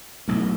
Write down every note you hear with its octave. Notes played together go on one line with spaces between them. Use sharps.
B1 A2